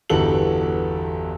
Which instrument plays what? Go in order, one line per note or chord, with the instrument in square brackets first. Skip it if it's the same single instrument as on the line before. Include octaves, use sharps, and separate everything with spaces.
[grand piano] G1 E2 F#4 G4 A4 F#7